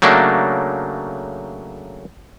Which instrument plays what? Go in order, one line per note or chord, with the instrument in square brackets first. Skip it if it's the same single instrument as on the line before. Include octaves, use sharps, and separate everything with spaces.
[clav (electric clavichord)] C#3 F#3 A3 A#3 D4